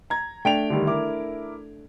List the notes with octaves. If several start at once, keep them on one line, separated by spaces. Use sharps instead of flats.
A#5 G#6
A3 D4 G5 D7 F7
D3 D#3 G3
E4 A#4 D6